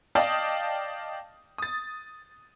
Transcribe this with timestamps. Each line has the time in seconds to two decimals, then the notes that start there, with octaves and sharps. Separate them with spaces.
0.15 D5 D#5 F5 G5 A5 D#6
1.58 D#6 A6